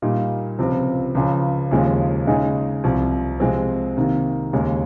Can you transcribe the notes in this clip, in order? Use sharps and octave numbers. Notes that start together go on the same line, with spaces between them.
A#2 G3 A#3 D#4
C#2 C3 F3 C4
C#2 C#3 F3
D#2 C#3 F3 G#3
C#3 G#3 D#4
C2 C3 F3
C3 F3 G#3 C4
C3 D#3 A#3
D#2 C#3 G#3